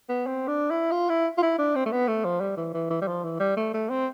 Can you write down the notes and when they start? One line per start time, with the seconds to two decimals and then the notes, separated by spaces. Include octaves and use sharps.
0.09 B3
0.27 C4
0.48 D4
0.71 E4
0.92 F4
1.09 E4
1.38 F4
1.42 E4
1.58 D4
1.75 C4
1.86 A3
1.92 B3
2.08 A3
2.25 F3
2.41 G3
2.57 E3
2.74 E3
2.90 E3
3.02 G3
3.08 F3
3.24 E3
3.39 G3
3.57 A3
3.74 A3
3.90 C4